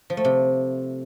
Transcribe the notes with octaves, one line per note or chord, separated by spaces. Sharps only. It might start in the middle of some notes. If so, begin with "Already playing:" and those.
F3
A3
C3